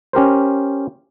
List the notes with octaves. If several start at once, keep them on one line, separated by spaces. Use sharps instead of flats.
C#4 G4 A#4 C5